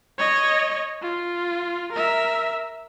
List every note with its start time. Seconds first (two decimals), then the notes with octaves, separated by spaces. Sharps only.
0.18 C#5 D#5
1.02 F4
1.93 A#4 E5